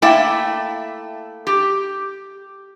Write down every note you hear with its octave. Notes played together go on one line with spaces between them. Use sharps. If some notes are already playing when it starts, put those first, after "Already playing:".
A3 A#3 E4 D5 E5 G5
G4